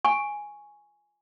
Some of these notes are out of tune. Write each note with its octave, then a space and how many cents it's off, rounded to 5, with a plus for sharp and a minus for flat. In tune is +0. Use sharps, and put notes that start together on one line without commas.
G#5 +0 C#6 +0